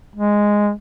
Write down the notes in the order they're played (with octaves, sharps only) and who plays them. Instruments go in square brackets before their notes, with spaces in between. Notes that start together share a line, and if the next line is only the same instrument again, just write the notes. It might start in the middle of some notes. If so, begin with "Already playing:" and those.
[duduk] G#3